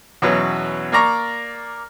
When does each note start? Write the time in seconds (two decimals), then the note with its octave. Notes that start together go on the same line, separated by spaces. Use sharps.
0.22 E2 B2 F#3 C#4 B4
0.92 A#3 D5 A#5 C#6